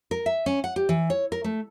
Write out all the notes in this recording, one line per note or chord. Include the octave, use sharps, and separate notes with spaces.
A#4
E5
C#4
F#5
G4
E3
C#5
A#4
A3